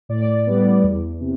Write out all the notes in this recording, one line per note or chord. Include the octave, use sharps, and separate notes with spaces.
A2 D5
G3 B3
E2
C3